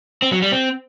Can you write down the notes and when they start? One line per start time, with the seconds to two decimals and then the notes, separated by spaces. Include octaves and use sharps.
0.22 C4
0.32 F#3
0.42 G3
0.52 C4